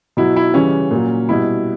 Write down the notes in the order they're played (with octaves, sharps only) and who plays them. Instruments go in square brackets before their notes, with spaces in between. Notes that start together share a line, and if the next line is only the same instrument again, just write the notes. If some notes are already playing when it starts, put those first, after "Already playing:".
[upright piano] B2 F#3 E4
E4
C#3 E3 G3 C#4
A#2 F#3
B2 G3 E4